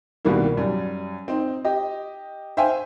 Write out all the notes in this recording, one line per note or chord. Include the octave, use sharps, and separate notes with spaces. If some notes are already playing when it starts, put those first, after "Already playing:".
C2 B2 D#3 G3 A#3 E4
F#2 G3
C4 D#4
G4 D#5
C5 E5 F5 G5 G#5